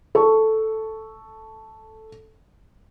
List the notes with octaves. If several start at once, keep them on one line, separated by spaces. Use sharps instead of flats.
A4 C#6